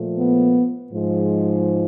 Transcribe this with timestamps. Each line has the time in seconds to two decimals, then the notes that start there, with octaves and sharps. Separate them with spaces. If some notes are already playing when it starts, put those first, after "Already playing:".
Already playing: A#2 F3 A3
0.18 B3
0.92 G#2 F3 G#3